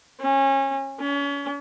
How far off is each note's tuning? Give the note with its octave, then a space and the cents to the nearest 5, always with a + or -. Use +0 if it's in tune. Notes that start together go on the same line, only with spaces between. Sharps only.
C#4 -25
C#4 +35